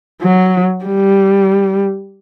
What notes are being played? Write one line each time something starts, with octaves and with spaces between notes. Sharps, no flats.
F#3
G3